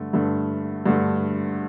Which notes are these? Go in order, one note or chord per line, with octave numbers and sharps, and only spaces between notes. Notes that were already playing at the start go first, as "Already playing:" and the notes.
Already playing: G2 D3 A3
G2 D3 A3
G2 D3 A3